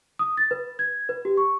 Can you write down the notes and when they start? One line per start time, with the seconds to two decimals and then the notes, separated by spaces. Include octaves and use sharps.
0.19 D#6
0.37 A6
0.51 B4
0.79 G#6
1.09 B4
1.25 G4
1.37 C#6